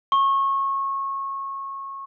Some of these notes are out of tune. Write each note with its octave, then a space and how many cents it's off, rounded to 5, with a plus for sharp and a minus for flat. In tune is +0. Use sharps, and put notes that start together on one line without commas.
C#6 -25